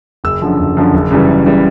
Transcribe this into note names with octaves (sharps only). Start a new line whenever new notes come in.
F#1 E6
F#2 D3 F3
F#1
F#2 D3 F3
F#1
F#2 C#3 E3 G3
F#1
C#3 E3 G3